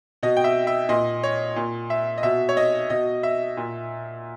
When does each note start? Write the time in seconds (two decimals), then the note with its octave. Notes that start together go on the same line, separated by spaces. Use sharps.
0.23 B2 D#5
0.37 G5
0.44 E5
0.67 E5
0.89 A#2 D#5
1.23 C#5
1.56 A#2
1.90 E5
2.18 D#5
2.23 B2 E5
2.49 C#5
2.57 D#5
2.90 B2 D#5
3.23 E5
3.57 A#2